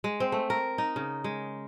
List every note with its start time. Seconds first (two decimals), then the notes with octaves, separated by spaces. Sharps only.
0.04 G#3
0.20 C4
0.32 A3
0.50 A#4
0.78 D#4
0.96 C#3
1.24 G#3